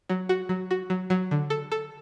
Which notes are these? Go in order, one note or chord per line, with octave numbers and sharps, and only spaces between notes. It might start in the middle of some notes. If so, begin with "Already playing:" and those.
F#3
F#4
F#3
F#4
F#3
F#3
D3
A4
A4